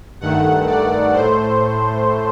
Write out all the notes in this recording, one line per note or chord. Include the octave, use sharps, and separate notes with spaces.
G2 D#3 A3 F#5
D5
A2 A3 C5